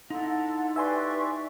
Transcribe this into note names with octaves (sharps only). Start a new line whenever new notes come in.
D#4 E4 A4 F#5 A5 C6
G4 B4 D5 E5 G#5 C6 C#6